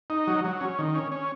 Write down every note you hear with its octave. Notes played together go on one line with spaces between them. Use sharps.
D#4
F#3
F#3
C#4
D#3
C#4
C#4